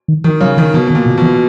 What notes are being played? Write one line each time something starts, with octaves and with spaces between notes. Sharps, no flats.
D#3
D#3 E3
C#3 F#3
D#3 E3
B2 E3
B2
D#3
A#2
B2
B2 E3